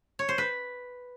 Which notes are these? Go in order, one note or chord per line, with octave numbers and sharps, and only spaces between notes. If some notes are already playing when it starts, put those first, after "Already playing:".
C#5
C5
B4